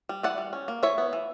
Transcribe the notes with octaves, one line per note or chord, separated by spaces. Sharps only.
G3
E3 D5 F#5
G3
C#4
A#3
E3 C#5 E5
B3
E3